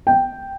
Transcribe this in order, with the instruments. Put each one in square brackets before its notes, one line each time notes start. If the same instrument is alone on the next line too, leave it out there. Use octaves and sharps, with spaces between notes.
[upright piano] G5